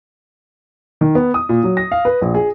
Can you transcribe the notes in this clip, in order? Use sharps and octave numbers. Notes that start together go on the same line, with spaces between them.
D#3
B3
D#6
A#2
F#3
A#6
F5
B4
A#1
G#4